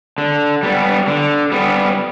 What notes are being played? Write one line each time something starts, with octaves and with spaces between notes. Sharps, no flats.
D3
G3 B3
D3
G3 B3